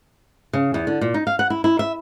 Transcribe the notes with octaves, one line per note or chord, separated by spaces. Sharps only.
C#3
E2
D3
A#2
D#4
F5
F#5
E4
E4
E5